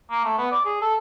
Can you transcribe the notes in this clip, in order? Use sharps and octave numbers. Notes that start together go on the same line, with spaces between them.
A#3
A3
B3
D5
G#4
A4